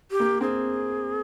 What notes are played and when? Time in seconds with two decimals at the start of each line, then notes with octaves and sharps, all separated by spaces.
0.11 G4
0.20 A#3
0.41 C4 G#4